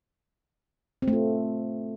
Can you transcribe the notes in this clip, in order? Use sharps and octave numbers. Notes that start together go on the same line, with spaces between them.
C4
A3
F4